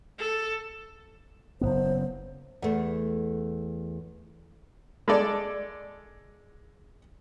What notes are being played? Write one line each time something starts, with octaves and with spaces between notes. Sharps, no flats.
A4
F#1 F2 B3 C5
E2 A3
G#3 A4 D5